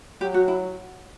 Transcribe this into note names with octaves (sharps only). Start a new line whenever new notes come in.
F#3 G4
F#4
E4